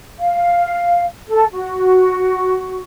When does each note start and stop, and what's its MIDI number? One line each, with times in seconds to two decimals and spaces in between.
0.19 1.06 77
1.28 1.45 69
1.54 2.83 66